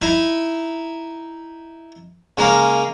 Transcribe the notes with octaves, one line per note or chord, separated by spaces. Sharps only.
D#4 E4 E5
C#3 G#3 A#3 A#4